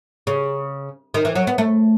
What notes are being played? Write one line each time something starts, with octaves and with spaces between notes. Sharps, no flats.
C#3
D#3
E3
F#3
B3
A3